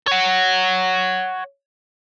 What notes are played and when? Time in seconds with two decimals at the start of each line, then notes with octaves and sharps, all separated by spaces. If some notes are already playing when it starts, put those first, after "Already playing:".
0.07 C#5 F#5